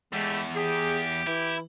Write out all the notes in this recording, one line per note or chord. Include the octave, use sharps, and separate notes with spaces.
E2 G#3 A3 G4
G4 G#4
E3 E4